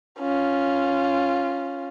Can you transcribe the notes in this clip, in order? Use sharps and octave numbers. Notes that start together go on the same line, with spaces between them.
C#4 F4